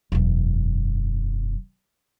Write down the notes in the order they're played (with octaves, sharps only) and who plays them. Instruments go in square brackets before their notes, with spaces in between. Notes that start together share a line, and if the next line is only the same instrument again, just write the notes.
[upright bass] E1 F#2